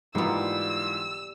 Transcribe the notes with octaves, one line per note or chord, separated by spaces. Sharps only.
G#2 E3 G3 A#3 B3 F4 E6